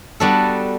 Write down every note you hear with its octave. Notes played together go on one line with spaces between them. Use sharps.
G3 B3 D4 F#4 A4